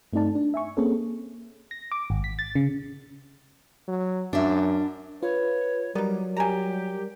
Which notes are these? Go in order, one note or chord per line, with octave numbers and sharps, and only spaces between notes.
G2 A3 C4 D#4 D5 A5
D4
E5 G#5 C#6
A#3 C4 C#4 G#4 A4
A#6
D6
G#1
B6
A6
C#3
F#3
F#2 D4 E5
F4 B4 C#5
F#3 G3 B3 D#4 A#4 D5
G4 G#5 A#5